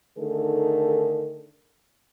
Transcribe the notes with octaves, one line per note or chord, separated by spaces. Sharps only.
D3 D#3 A3 D#4 G#4 A#4